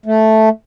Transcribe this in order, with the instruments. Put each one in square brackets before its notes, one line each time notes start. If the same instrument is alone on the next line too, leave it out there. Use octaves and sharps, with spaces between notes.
[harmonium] A3